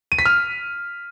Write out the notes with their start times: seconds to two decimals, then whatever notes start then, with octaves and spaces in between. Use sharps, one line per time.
0.12 D#7
0.19 B6
0.26 F6